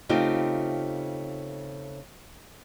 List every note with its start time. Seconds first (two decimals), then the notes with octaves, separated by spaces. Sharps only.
0.09 C#3 A3 C4 D#4 F4 G4